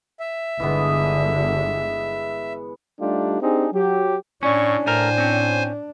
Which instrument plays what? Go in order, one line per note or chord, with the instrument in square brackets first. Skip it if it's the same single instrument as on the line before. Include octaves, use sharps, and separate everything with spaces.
[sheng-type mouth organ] E5
[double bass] G1 D3 [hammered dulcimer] E3 G#3 B3
[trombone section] G3 A3 D4 D#4 F4 G4
C4 D4 D#4 G4 G#4
F#3 G4
[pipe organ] A2 [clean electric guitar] C#4 [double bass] D4 [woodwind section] D5 C#6
[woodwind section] A2 [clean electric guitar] A3 A#4 [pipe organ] C5 G#5
[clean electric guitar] C4 C#4